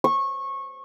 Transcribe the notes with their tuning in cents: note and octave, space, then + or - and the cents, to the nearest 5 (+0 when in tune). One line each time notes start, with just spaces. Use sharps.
C#6 -20